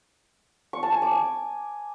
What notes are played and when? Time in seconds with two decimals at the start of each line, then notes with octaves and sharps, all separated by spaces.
0.73 C#6
0.83 A5
0.92 G#5
1.02 D6
1.11 G#5